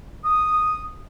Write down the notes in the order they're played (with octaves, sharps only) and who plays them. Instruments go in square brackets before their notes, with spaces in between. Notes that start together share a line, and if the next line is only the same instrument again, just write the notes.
[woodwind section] D#6